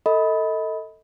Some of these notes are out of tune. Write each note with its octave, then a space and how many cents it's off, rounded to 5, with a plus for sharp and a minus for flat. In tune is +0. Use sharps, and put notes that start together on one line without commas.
A4 +20 D#5 +30 B5 +0